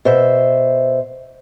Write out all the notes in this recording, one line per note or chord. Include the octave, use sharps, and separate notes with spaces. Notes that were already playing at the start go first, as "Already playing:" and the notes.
B2 C5 E5